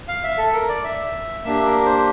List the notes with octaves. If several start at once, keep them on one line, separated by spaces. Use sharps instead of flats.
F5
E5
A4
A#4
D5
E5
A#3 D4 G4 E5
A#4
C5